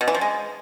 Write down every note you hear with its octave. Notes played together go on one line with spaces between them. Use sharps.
B2
E3
F3
G#3